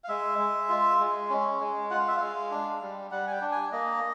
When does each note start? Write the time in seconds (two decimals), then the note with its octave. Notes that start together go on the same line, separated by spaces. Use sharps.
0.04 F5
0.08 G#3 E5
0.39 G#3
0.69 F4
1.00 G#3
1.30 C#4
1.60 G#3
1.90 F4 F#5
1.99 F5
2.08 E5
2.17 G#3 F5
2.51 D4
2.81 G3
3.11 G3 F#5
3.27 G#5
3.32 G5
3.42 D4
3.52 G#5
3.72 A#3 D#5